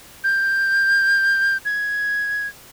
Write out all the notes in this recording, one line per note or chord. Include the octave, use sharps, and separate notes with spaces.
G6
G#6